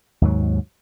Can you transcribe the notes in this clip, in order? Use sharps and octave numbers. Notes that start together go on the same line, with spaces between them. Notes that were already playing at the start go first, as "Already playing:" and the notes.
D#2 G#2 F#3